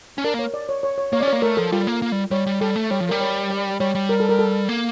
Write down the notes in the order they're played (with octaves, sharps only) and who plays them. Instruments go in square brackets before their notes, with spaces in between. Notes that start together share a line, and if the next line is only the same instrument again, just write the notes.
[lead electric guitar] C#4
[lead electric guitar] D4 [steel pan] A#4
[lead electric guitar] A#3
[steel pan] C#5
D5
C#5
C#5
C#5
[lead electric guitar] A#3 [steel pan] C#5
[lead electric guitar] C#4 [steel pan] D5
[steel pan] C#5
[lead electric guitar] A#3
[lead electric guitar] A3 [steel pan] A#4
[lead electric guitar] F3 [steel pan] A4
[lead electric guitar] G3 [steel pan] F4
[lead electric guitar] A#3
A#3
G3
[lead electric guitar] G3 [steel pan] C#5
[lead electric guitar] G3
[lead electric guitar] G3 [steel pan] A4
[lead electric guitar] A3
[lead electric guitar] G3 [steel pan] C#5
[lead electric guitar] F3
[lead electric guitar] G3 [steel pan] A#4
[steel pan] C#5
D5
[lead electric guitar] G3 [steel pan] C#5
[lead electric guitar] G3
[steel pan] A#4
A4
A#4
A4
[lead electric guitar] A#3